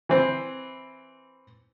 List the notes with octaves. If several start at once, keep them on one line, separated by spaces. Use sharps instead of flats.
E3 C4